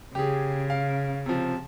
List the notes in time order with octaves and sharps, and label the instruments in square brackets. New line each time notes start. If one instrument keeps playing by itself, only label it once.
[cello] C#3 [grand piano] G4 G#4
[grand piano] F5
C3 F3